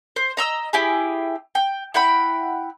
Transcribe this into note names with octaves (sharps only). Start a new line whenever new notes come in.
C5
D#5 A#5 E6
E4 G4 G#4
G5
E4 F#5 G5 B5